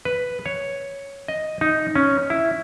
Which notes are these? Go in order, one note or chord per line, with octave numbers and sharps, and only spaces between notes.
B4
C#5
D#5
D#4
C#4
E4